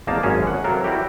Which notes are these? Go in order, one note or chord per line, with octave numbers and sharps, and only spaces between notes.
G#1 E2 A#3 D#4 F5 A5
G#1 F#2 C#4 G#4
F#5
C3 F#3 A4 A#4 F5
G3 E4 F#4 G4